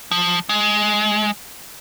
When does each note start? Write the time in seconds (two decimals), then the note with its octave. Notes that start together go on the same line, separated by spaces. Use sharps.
0.11 F3
0.49 G#3